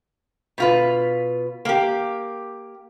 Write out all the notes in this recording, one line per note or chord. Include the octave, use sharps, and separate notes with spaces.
B2 F4 B4
A#3 G4